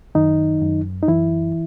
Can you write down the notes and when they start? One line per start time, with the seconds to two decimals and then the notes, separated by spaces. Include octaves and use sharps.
0.15 F#2 D#3 D#4
0.62 F#2
1.03 D#4
1.08 F#2 E3 E4